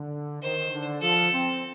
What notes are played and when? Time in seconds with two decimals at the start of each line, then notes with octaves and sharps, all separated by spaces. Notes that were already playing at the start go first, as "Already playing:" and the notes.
Already playing: D3
0.41 D#3 C5
0.72 D3
1.01 F3 A4
1.31 C4